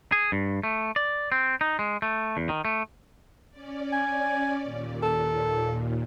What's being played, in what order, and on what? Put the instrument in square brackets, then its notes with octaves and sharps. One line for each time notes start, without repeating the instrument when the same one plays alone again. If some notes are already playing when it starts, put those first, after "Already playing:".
[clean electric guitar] G#4
G2
A3
D5
C4
D#4
G#3
A3
E2
D#3
A3
[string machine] C#4 D5
[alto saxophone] G#5
[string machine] D#2 A#2
[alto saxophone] A4